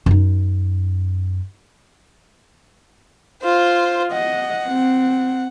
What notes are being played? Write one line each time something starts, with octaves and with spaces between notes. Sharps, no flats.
F#2 D#4
F4 C5
D#5 F#5
C4